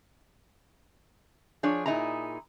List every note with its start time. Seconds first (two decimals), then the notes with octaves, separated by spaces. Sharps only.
1.63 F3 D4 G#4 C#5
1.86 A#2 D#4 E4 G#4 A#5